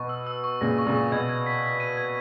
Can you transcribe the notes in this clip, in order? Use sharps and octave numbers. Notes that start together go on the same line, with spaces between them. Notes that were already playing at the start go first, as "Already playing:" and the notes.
Already playing: B2 C#6
E6
E6
C#6
A#2 C#3 A#6
C#6
A#2 C#3
C#6
B2 G#6
G#6
B6
B6
D#7
G#6